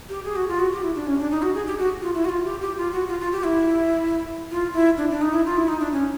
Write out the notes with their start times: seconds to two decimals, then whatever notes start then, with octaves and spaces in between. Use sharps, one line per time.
0.09 G4
0.25 G#4
0.36 F#4
0.49 F4
0.59 F#4
0.72 G4
0.83 E4
0.96 D4
1.07 C#4
1.19 D4
1.31 D#4
1.42 F#4
1.54 G#4
1.67 G4
1.79 F#4
2.02 F4
2.14 E4
2.25 F#4
2.29 F4
2.45 G4
2.61 G4
2.78 F4
2.93 F#4
3.08 F4
3.20 F4
3.32 G4
3.44 E4
4.51 F4
4.74 E4
4.97 D4
5.10 D4
5.22 D#4
5.34 E4
5.46 F4
5.57 E4
5.68 D#4
5.80 D4
5.92 C#4